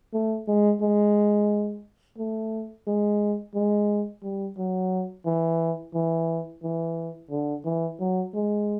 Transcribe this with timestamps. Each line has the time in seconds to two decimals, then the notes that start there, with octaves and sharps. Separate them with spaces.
0.13 A3
0.47 G#3
0.81 G#3
2.18 A3
2.87 G#3
3.55 G#3
4.23 G3
4.57 F#3
5.25 E3
5.94 E3
6.63 E3
7.31 D3
7.65 E3
8.00 F#3
8.34 G#3